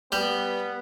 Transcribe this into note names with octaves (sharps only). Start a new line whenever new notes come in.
G3 B3 G5